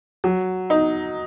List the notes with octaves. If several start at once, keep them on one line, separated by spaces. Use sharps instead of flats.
F#3
D#4